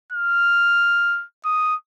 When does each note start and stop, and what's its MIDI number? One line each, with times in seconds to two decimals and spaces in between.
0.12 1.24 89
1.45 1.75 87